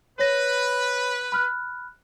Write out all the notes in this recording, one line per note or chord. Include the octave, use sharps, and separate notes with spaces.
B4 C#5 A#6
B5 F6 F#6